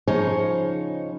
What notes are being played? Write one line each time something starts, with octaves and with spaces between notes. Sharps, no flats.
C#3 F3 D#4 C5 C#5 G#5